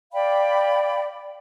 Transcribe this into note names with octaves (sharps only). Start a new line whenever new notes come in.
D5 F5 G5 B5